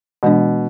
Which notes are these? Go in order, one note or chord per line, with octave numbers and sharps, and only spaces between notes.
B2 E3 G#3 D4